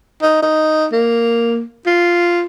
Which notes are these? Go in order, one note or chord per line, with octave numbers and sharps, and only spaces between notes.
D#4
D#4
A#3
F4